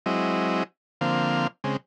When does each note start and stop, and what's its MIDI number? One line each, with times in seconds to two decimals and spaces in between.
0.06 0.63 54
0.06 0.63 56
0.06 0.63 60
0.06 0.63 64
0.06 0.63 75
1.01 1.47 50
1.01 1.47 53
1.01 1.47 58
1.01 1.47 60
1.01 1.47 77
1.64 1.77 49
1.64 1.77 56
1.64 1.77 60